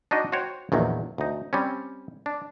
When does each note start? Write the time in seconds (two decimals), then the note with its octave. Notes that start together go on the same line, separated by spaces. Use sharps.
0.11 D4 D#4 F#4 D#5
0.32 F#4 C5 C#5 G5
0.72 A#1 E2 D#3 F#3
1.18 D2 D#4
1.53 G3 C4 C#4
2.26 D4